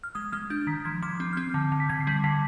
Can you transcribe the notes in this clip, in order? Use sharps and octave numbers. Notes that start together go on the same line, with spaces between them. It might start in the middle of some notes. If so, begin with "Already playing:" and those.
F6
G#3 D#6
G#3 F6
D4 G6
D#3 B6
F3 G#6
F3 D6
C4
F6
C4 G6
D3
D3
B6
D3 G#6
C7
G3 B6
D3 B6